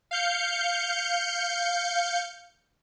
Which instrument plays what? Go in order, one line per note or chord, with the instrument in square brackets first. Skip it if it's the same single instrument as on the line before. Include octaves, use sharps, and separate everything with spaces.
[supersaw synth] F5 G6 C#7